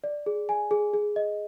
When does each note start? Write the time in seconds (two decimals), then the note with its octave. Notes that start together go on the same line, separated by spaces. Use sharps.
0.04 D5
0.26 G#4
0.49 G#5
0.71 G#4
0.93 G#4
1.16 D#5